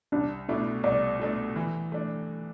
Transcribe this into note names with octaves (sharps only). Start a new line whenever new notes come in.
C2 D4
B2 A3 D4 E4
C2 D5
B2 A3 D4
E3
A3 D4